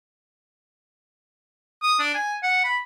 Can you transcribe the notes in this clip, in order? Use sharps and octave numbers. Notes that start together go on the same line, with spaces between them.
D#6
D4
G#5
F#5
B5